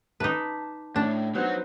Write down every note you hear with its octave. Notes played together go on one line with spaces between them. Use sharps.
D#4 B4 A5 D6 B6
A2 D4
F#3 B3 D#4 F#4 C5